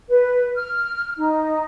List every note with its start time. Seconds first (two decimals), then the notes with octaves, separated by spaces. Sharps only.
0.08 B4
0.55 F6
1.17 D#4